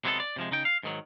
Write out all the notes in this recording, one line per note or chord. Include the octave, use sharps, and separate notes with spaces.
C3 F#3 G#3 B3 G#4 A4
D5
C3 F3 G#3
C#3 D#4 G5
F5
G#2 D#3 F#3